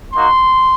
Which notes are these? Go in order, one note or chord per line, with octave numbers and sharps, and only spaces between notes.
A#3 D#4 F#4 C6